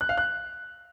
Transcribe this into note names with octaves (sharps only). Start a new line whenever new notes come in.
F#6
F5
F#6